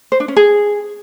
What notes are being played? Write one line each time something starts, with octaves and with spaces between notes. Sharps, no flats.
C5
D4
C#4
G#4